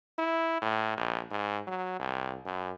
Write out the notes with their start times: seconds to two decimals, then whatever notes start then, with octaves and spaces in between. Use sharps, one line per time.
0.18 E4
0.62 A2
0.97 A#1
1.31 G#2
1.67 F#3
1.99 C2
2.45 F#2